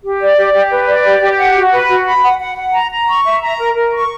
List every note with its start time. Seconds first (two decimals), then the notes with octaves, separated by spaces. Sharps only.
0.02 G4
0.20 D5
0.36 G4
0.53 G4
0.71 B4
0.87 D5
1.04 G4
1.20 G4
1.37 F#5
1.55 F#4
1.71 B4
1.88 F#4
2.06 B5
2.22 F#5
2.39 F#5
2.57 F#5
2.74 A#5
2.91 A#5
3.08 C#6
3.25 E5
3.41 A#5
3.58 A#4
3.75 A#4
3.92 C#6